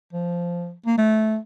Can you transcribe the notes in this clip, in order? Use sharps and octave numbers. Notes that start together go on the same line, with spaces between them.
F3
A#3
A3